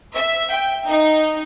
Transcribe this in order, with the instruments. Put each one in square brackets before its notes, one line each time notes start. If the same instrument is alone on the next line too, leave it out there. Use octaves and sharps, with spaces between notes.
[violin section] E5
G5
D#4